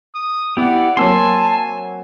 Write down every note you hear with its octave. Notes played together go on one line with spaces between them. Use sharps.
D#6
B3 E4 G4 D5 F#5
F#3 A#3 C4 G#5 A5 C6 E6